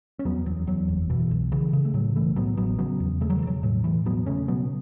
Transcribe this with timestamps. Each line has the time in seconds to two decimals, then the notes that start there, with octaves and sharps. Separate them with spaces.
0.19 C#4
0.25 E2 F#3 B3
0.46 E2 F#3
0.67 E2 F#3
0.88 F#1
1.10 B2 E3
1.31 B1
1.52 C#3 E3
1.73 C#3
1.85 A3
1.94 A2 F#3
2.15 B1 E3 A3
2.36 A2 F#3 B3
2.57 A1 F#3 B3
2.78 C#3 F#3 B3
3.00 E2
3.21 C#3 A3
3.30 F#3
3.38 E3
3.42 E1
3.47 F#3
3.63 A2 F#3
3.84 A2 E3
4.05 E1 F#3 B3
4.26 C#3 A3 C#4
4.48 B2 F#3 B3